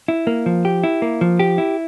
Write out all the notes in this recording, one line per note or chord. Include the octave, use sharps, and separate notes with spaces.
E4
A#3
F3
G4
E4
A#3
F3
G4
E4